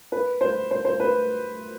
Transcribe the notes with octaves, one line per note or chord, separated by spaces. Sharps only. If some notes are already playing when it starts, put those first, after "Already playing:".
B4
C5
C5
C5
B4